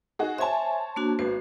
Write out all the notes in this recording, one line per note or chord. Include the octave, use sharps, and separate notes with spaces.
D#4 F#4 G#4
C5 C#5 E5 G#5 A5
A#3 D4 F#4
G#1 B3 F#4 C7